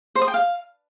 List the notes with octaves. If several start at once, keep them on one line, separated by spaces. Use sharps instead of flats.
C5
D#6
G5
F5